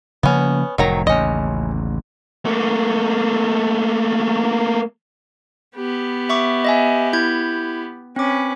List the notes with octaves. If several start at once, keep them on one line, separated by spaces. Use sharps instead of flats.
C#3 F3 A#3 B3 C#4
F1 A2 D#3 F#3 A#5
A1 D#2 C#3 C#4 D#5
A3 A#3
B3 G4
E5 C#6 D6
D#5 E5 G#5
E4 G6 G#6
C4 C#4 B4 D6